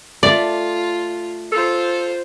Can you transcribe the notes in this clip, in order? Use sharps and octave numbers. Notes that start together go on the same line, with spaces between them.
A3 F4 D5
F4 A4 C5